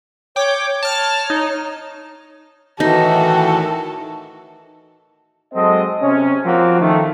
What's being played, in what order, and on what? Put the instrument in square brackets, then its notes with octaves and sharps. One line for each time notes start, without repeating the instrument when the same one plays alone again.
[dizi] C#5 [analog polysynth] G5 D6
[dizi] C#5 [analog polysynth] A5 F6
[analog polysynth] D#4
[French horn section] A2 F#4 [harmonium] D#3 E3 [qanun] D#4 [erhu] A4
[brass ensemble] F#3 G#3 C4 F#4 A4 D#5
C3 C#4
F3 A#3 C4 F#4
D#3 A3